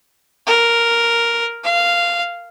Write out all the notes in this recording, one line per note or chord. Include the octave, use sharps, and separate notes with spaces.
A#4
F5